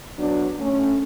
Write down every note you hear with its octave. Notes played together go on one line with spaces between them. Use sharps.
F#3 B3 D4
A3 C#4